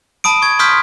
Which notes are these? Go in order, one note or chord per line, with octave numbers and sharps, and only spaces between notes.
A5 B5 D#6 D7
C#6 G#6
C6 C#6 D#6 F6 G6 B6